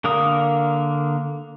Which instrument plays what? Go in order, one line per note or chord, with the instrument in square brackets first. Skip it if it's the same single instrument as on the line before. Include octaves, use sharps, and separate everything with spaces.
[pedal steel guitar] D3 A#3 A#4 D#6